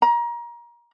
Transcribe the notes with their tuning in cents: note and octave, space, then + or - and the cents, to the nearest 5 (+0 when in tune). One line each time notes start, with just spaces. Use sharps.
A#5 +25